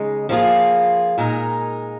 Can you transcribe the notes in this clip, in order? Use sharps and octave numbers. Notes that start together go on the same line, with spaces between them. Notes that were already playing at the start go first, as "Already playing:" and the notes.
Already playing: C#3 G#3 D#4
F3 A#3 F4 G#4
A#2 G#3 D#4 A#4